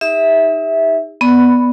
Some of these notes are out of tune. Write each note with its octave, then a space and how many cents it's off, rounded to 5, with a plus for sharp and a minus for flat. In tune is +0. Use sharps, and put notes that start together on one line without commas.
D#4 +20 G4 +45 E5 -10
B3 +0 D5 +0 B5 +15